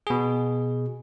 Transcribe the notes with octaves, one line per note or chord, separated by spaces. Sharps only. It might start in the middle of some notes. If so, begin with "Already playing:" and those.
B2 G#4